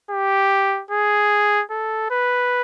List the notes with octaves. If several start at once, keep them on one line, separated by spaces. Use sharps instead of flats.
G4
G#4
A4
B4